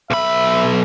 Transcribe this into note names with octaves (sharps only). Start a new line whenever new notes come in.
B1 E5 B5